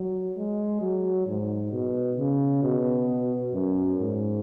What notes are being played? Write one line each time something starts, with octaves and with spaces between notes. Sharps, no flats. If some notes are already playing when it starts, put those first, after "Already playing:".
Already playing: F#3
G#3
F#3
G#2
B2
C#3
B2
F#2
G#2